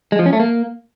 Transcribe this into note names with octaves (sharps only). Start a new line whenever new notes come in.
G#3
F3
C#4
A3
A#3